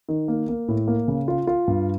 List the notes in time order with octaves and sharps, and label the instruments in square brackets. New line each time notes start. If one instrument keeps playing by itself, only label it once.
[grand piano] D#3
A#3
A#3
A2
A#3
C#3
F4
F4
G2